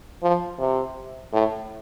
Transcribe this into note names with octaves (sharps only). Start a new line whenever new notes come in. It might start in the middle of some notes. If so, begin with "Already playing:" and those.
F3
C3
A2